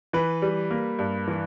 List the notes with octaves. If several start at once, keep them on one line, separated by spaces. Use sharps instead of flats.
E3 B4
G3
A#3
G2
E3